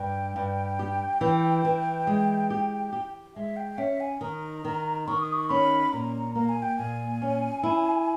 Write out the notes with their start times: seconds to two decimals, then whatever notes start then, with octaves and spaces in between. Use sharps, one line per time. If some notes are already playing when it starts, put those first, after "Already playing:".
Already playing: G2 G5
0.36 G2
0.79 G4
1.21 E3
1.65 E3
2.07 G#3
2.50 G4
2.93 G4
3.35 G#3 E5
3.57 G5
3.78 C#4 E5
4.00 G#5
4.21 D#3 A#5
4.65 D#3
5.07 D#3 C#6
5.21 D#6
5.33 C#6
5.49 C#4 B5
5.92 A#2 A#5
6.35 A#3 A#5
6.49 G#5
6.62 G5
6.77 A#2 G#5
7.22 C#4
7.63 E4